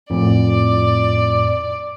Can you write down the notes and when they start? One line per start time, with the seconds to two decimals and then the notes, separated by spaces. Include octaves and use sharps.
0.10 F2 A2 D5